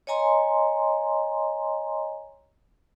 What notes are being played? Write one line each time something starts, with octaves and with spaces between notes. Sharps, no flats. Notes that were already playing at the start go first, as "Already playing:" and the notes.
C#5 D#5 G#5 A#5 C6